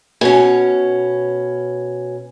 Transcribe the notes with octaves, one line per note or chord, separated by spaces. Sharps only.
B2 C#4